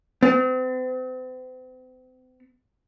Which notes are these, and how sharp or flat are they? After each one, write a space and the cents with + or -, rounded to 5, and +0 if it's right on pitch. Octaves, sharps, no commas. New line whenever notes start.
C4 -40